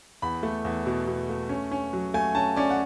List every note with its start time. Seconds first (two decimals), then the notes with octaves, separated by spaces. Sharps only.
0.22 E2 B5
0.43 A3
0.65 E2
0.86 B2
1.07 B2
1.29 A3
1.49 C#4
1.71 C#4
1.93 F#3
2.14 A3 G#5
2.35 C#4 A5
2.56 C#4 D5
2.70 F#5